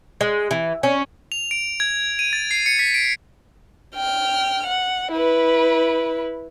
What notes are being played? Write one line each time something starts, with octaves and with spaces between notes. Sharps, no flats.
G#3
E3
C#4
F7
D7
G#6
D#7
A6
C7
C#7
B6
D7
G5 F6
F#5
E4 B4